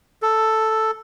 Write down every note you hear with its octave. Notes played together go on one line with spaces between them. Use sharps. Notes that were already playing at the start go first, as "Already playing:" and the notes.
A4